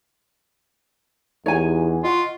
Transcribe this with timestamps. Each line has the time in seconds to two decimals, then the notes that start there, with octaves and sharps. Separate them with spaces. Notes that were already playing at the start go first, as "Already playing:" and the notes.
1.46 E2 D#4 G4 C#5 G#5
2.04 F4 D#5 F#5 C#6